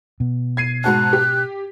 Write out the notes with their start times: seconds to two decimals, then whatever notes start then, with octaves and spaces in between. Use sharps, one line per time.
0.20 B2 B3
0.57 G#6 C7 D#7
0.84 G#2 F#4 A5 F#6
1.13 G4